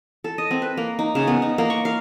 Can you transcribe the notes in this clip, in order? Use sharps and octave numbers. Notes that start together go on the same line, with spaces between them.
A4
D#5
C4
B4
A#3
D#4
C#3
B3
D#4
A#3
C#6
F5